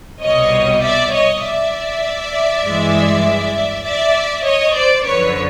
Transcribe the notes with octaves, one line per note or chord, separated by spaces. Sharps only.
C2 B2 G3 C#5 D#5
D5 E5
C#5 D#5
D5 E5
G2 E3 G#3
D5 E5
C#5 D#5
C5 D5
F#2 D3 F3 B4 C#5